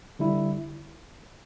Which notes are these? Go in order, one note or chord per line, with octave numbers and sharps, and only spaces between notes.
D3 G3 E4